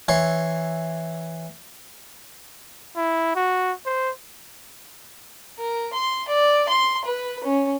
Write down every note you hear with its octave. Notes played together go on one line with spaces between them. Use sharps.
E3 C#5 C6
E4
F#4
C5
A#4
C6
D5
C6
B4
C#4